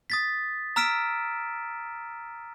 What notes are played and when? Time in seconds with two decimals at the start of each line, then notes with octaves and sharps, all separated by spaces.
0.10 D#6 A6 B6
0.76 A#5 E6 F6 B6 D7 E7